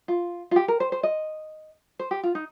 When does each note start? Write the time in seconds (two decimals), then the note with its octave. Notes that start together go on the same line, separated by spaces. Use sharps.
0.08 F4
0.51 F4
0.56 G4
0.68 A#4
0.80 C5
0.92 C5
1.03 D#5
1.99 C5
2.11 G4
2.23 F4
2.35 D#4